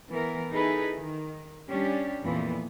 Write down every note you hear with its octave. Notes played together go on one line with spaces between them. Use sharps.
E3 B3 A#4
D#4 E4 G#4 A4 B4
D#3
G3 C#4 D4 G4
F2 A#2 E3 F3 B3